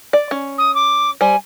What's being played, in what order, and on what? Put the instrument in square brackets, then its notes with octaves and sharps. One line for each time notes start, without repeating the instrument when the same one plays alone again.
[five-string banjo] D5
C#4
[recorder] D#6
D6
[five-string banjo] G3 C5 [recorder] G#5